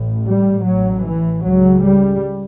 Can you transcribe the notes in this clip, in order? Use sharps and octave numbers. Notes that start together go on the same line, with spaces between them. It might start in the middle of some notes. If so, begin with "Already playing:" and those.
Already playing: A1 A2
G3
A1 A2 F#3
E3
C#2 C#3 F#3
G3